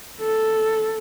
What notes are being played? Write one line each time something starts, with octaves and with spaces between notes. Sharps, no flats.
A4